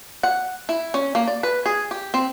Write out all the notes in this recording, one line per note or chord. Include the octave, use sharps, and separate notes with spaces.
F#5
E4
C#4
A#3
D5
B4
G#4
G4
C4